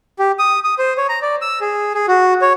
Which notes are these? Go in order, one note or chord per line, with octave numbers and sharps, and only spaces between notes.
G4
D#6
D#6
C5
C#5
A#5
D5
E6
G#4
G#4
F#4
C#5